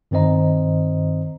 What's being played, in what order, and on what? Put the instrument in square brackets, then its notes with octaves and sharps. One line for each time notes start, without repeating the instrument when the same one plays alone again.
[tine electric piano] G2 D#3 C4 C5 D#5 A#5